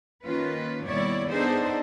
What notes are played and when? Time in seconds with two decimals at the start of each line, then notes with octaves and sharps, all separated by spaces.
0.23 D#3 A#3 C#4 F4 B4
0.85 D#2 B2 G3 E4 C#5 D5
1.29 B3 D4 D#4 G#4 A4 C5